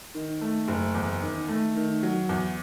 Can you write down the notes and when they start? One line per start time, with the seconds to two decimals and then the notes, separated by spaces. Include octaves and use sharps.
0.15 D#3
0.41 A3
0.68 F#1
0.94 E2
1.22 D#3
1.48 A3
1.75 D#3
2.03 F#3
2.29 E2